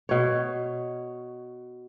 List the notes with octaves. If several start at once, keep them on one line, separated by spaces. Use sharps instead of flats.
B2 C#5